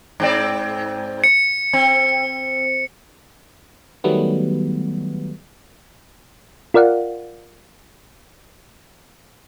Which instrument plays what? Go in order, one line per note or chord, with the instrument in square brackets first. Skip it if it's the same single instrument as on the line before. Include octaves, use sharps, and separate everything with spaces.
[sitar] G#2 C4 D5
[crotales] C#7
[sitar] C4
[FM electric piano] D#3 F#3 G3 A3 B3
[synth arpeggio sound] F4 A#4 D5 F5 F#5